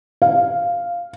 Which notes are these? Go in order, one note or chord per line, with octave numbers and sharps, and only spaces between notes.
F5